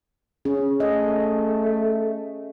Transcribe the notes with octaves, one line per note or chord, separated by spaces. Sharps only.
C#4 G#4
A3 D#5